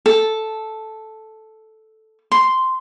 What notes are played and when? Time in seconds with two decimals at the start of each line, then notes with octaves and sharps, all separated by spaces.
0.06 A4
2.32 C6